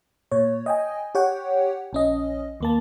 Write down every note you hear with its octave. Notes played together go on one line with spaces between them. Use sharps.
A#2 C#5
D#5 G5 G#5
G4 C#5 F#5 G5
A#1 C#4 D#5
D#2 A#3 A5